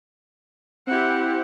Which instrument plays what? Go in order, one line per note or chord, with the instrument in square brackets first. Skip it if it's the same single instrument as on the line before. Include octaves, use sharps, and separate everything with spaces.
[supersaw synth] C4 E4 [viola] G4 F#5